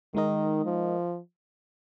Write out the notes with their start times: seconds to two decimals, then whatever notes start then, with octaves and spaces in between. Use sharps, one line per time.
0.15 D#3 G#3 D#4 A#4 D#5
0.66 F3